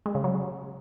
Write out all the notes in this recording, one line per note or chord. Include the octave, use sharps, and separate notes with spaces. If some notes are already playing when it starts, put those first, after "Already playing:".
G#3
C#3
F#3